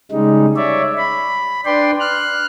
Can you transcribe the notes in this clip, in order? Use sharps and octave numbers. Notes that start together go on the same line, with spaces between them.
C#3 G3 G#3 D#4
C#5 D5 E5
B5
D4 B4 D5 G5 C6
F6 F#6